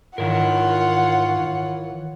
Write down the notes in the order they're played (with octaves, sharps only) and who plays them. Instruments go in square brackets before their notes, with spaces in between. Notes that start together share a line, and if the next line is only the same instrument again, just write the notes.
[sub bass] G#2 [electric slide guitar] D#3 E3 A#4 [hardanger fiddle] F4 C#5 [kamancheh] F#5